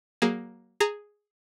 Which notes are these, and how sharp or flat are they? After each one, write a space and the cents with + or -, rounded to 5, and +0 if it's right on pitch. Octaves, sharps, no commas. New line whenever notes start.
F#3 +20 A#3 +10 G#4 +0
G#4 +0 A#5 -25